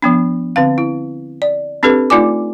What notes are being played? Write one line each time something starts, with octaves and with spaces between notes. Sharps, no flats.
F3 B3 D4
D3 C4 F5
E4
D5
C4 D4 G4 A4 B4
A3 D#4 F4 D5 G#5 D6